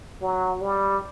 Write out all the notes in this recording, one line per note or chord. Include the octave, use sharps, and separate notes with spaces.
F#3
G3